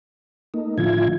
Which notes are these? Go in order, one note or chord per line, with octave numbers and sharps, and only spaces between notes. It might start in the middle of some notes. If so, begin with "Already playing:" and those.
A3 A#3 D#4
A2 D3 F3 E4 F4 G#6